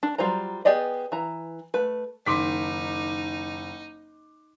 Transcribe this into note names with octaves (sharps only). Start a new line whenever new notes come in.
D4
F#3 G3 F4 C5 A#5
B3 G4 G#4 D5 D#5
E3 A#5
A3 B4
F#1 D#3 D#4 C6 D6 B6